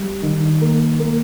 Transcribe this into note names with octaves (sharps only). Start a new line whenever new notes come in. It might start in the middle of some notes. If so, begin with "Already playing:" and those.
Already playing: G3
D#3
A#3
A#3